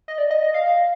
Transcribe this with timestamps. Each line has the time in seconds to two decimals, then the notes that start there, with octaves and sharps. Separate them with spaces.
0.08 D#5
0.18 D5
0.31 D#5
0.43 D#5
0.54 F5